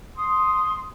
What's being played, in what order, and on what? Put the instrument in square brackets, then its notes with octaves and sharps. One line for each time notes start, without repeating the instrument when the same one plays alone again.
[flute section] C6 D#6